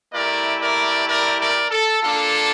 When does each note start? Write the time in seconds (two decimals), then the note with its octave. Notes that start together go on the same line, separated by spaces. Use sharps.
0.12 A3 E4 G4 A#4 D5
0.60 A#4 D5
1.07 A#4 D5
1.39 A#4 D5
1.70 A4
2.03 A#3 D4 F4 A4